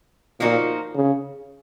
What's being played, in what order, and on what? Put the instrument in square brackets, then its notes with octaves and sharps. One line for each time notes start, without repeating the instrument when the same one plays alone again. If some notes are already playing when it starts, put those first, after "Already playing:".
[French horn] A#2 [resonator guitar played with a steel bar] F3 A#3 D#4 F#4
[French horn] C#3